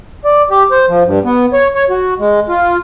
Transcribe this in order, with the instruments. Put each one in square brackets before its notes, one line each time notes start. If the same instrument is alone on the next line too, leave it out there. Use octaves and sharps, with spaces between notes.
[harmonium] D5
G4
C5
F3
G2
B3
C#5
C#5
F#4
G#3
F4